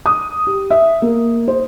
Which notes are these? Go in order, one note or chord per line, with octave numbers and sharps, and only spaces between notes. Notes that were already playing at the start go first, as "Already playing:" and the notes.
D#6
G4
E5
A#3
C5